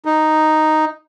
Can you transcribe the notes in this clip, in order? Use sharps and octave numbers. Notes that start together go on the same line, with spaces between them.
D#4